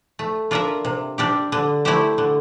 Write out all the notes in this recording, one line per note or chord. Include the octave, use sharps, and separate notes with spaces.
A3
D4 F4 A#4 E5
C3
G3 D4 G4
D3
A3 E4 G4 C5
D3